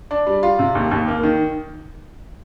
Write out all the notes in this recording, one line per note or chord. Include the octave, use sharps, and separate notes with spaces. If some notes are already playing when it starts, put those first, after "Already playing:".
D4
G3
F4
C3
D#2
D#2
A#3
D#3